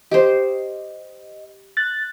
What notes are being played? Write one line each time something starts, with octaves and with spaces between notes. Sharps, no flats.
G4 C5 D#5
F#6 A6